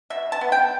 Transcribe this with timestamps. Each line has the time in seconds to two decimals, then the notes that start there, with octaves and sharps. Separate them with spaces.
0.10 B2 E5
0.32 A5
0.41 B3
0.52 G5